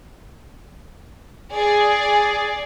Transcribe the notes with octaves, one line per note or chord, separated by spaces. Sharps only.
G#4 D5